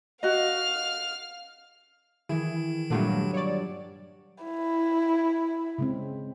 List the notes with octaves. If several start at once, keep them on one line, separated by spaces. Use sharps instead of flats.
F#4 D#5 F5 F6
D#3 E3 E4 G#4
G2 A#2 F#3 A3 D4 F4
C#5 D5
E4
C#3 G#3 C4